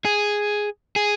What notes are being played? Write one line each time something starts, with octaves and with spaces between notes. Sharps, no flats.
G#4
G#4